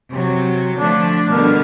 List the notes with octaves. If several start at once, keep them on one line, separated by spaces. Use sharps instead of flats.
C3 F#3
D3 F3 A3 D4
B2 D3 G3 A#4